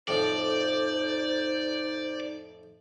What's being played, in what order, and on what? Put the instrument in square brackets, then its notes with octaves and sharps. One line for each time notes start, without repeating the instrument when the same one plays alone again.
[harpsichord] F2 A2 F3 [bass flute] D#4 [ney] C5 [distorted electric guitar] D5